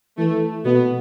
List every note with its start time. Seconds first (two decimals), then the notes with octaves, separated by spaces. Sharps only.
0.18 E3 A3
0.65 B2 B3